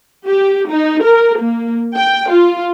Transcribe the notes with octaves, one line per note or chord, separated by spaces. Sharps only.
G4
D#4
A#4
A#3
G5
F4